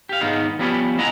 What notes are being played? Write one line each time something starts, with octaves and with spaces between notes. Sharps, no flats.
G4 F5
D#2 G#2 G#3 B3 D#4 F5
F3 G3 B3 C#4 G4 B4
A#3 E4 D#5 F#5 G#5 A#5